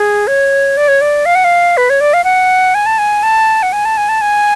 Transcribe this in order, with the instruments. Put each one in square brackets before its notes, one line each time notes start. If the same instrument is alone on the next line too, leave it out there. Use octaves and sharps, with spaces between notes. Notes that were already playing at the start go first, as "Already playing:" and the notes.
Already playing: [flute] G#4
C#5
D5
C#5
D5
F5
F#5
F5
B4
C#5
D5
F5
F#5
G#5
A5
G#5
A5
F#5
G#5
A5
G#5
A5
G#5